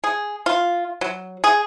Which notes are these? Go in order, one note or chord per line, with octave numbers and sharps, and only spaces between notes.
G#4
F4
F#3
G#4